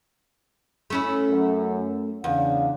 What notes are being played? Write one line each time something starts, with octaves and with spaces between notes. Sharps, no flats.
A3 C#4 E4
F#2
E2 C#3 D4 F5